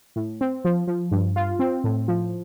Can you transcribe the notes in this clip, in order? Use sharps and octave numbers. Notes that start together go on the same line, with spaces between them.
A2
C4
F3
F3
G2
F4
C4
A2
F3